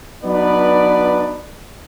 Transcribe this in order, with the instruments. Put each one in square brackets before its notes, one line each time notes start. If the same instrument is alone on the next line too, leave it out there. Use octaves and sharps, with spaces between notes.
[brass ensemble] F#3 B3 D4 D#4 B4 D5